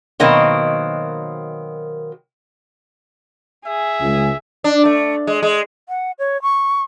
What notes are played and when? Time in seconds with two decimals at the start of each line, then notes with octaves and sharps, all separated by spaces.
0.20 B2 D#3 F#3 A#3 C4
3.66 G#4 E5
4.01 C#2
4.64 D4
4.85 A3
5.27 G#3
5.42 G#3
5.89 F#5
6.19 C#5
6.42 C#6